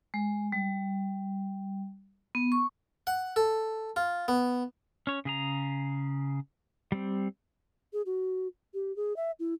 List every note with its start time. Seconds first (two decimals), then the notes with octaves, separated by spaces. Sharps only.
0.14 G#3
0.52 G3
2.35 B3
2.52 C#6
3.07 F#5
3.36 A4
3.96 F4
4.28 B3
5.07 C#4 C#5
5.25 C#3 G#4 A#5
6.92 G3 C4
7.93 G#4
8.06 F#4
8.74 G4
8.96 G#4
9.16 E5
9.40 E4